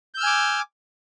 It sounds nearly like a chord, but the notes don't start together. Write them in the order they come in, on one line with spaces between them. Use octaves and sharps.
G6 E6 F6 G#5 D6